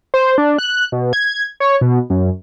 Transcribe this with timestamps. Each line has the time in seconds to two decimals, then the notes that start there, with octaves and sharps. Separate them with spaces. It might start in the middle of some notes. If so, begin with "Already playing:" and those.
0.14 C5
0.38 D4
0.59 F#6
0.92 B2
1.13 G#6
1.60 C#5
1.81 B2
2.10 F#2